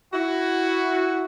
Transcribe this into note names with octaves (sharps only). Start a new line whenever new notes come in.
E4 F#4